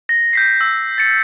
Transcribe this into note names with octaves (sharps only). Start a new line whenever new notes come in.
A#6
G6 B6 C7
E6
A6 C#7